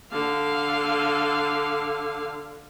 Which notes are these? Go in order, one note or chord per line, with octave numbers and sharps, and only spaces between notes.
D3 F5